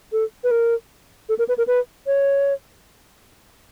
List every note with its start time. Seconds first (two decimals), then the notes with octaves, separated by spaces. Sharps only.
0.12 A4
0.44 B4
0.51 A#4
1.29 A4
1.39 A#4
1.48 B4
1.58 A#4
1.67 B4
2.07 C#5